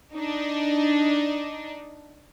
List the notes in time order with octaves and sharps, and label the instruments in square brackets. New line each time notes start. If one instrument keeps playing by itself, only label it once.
[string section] D4 D#4